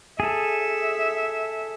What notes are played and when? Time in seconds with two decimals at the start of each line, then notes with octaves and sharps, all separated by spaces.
0.20 G#4 A4 E5